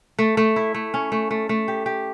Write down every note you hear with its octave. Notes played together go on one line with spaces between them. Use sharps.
A3
A3
E4
A3
C#4
A3
A3
A3
G4
G4